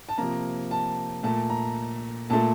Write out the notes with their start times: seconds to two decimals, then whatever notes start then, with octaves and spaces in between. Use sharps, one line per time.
0.09 A5
0.18 C3 F3 A#3 A#5
0.71 A5
1.23 A#2 A3 A5
1.50 A#5
2.30 A#2 A3 A5